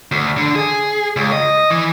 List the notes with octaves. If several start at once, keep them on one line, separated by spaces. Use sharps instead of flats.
D2
D3
G#4
C#2
D#5
E3